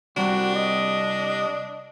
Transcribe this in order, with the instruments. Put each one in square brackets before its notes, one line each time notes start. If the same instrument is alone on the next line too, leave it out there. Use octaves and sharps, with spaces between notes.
[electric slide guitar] C3 G3 [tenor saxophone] D4 [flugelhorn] F#4
[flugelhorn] D#5